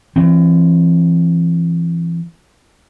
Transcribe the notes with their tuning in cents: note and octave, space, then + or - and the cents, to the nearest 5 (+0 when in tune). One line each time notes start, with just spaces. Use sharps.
E3 +40 C4 +25